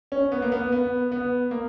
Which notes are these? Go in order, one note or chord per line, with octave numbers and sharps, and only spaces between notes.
C#4
B3
A#3
B3
B3
B3
A#3